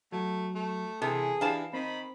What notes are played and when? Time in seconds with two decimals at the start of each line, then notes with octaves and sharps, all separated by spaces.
0.12 F#3 A3
0.55 A3
1.02 C3 E3 G#4 A4
1.41 E3 D4 G4 B4 F5 A5
1.73 D#3 C4 B5